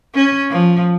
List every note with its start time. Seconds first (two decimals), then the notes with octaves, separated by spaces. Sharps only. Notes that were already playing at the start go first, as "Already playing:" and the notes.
0.14 C#4
0.50 F3